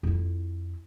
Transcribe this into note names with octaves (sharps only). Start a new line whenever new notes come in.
F2 E4